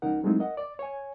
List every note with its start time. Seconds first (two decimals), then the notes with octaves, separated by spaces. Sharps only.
0.02 C#2 F3 C#4 D#4 A#4 F#5
0.24 F#3 G#3 A3 C4 D#4 E4
0.39 A#4 D#5 F#5
0.57 D5
0.79 C#5 G#5